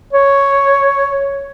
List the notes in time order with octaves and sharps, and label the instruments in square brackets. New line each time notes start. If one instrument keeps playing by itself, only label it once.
[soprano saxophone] C#5